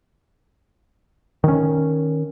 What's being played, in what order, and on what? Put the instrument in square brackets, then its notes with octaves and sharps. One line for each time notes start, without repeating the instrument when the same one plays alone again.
[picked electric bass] D#3 C#4